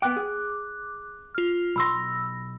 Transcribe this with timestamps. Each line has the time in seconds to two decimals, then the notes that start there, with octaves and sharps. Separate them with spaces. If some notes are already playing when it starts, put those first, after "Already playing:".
0.02 B3 G5 D6 F#6
0.16 G#4
1.35 F4 F6
1.76 B1 B5 C6 E6 A#6